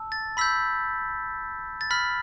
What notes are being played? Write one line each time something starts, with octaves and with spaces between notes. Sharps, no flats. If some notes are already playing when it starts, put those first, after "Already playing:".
Already playing: A5 E6
A6
B5 E6 G6 B6
A6
B5 F6 B6